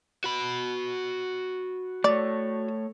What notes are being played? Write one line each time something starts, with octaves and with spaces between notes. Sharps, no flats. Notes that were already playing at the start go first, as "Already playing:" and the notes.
F#4 B5
A3 C#5 D5